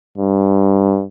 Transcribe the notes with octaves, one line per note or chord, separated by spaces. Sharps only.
G2